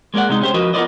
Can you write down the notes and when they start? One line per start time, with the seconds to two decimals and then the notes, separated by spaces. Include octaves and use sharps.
0.14 G#3 A#3 G#4 D5 F#5
0.29 C3 G#3 D#4
0.41 C#4 G4 C5
0.54 F3 F#4 A#4 B4 D#5
0.74 B3 F4 A#4 C5 D5 D#5